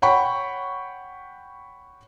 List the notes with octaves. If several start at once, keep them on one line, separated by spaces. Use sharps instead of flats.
C#5 F#5 G5 B5 C#6